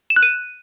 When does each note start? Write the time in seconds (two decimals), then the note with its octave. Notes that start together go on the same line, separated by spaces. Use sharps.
0.10 E7
0.16 F#6
0.23 D#7